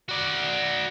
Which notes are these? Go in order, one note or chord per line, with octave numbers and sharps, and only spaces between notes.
F#4 D5